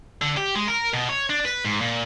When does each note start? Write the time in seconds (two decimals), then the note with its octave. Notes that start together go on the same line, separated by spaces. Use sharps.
0.22 D3
0.37 G4
0.55 G#3
0.68 A#4
0.94 B2
1.09 C#5
1.30 D4
1.45 B4
1.65 G#2
1.81 A#2